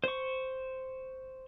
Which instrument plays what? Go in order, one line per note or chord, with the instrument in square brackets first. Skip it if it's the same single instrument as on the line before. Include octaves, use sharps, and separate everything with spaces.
[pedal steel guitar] C5 C#6